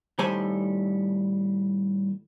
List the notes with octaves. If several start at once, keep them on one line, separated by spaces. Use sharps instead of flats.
A2 D#3 G3 A4 C5 G#5